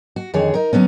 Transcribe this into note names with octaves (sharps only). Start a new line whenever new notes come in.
F#4
F2 D3 D#3 G#4 C#5
D#4 A#4
D3 F#3 B3 C#4